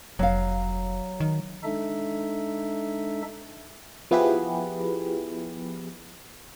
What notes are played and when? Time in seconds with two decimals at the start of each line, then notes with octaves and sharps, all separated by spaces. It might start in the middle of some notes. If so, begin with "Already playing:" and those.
0.19 F1 F#3 F5
1.20 D#3
1.63 G#3 D4 D#4 A4 E5
4.11 F3 B3 E4 G4 G#4 B4